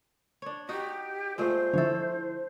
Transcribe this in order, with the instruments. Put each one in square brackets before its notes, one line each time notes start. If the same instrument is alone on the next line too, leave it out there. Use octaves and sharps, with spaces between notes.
[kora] D4 C#5
[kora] D#4 F#4 [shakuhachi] G4
[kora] A#2 G#3 A3 [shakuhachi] C5
[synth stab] D3 F3 E4 [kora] A4 C#5